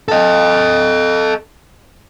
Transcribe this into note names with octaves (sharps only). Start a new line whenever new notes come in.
A4 D#5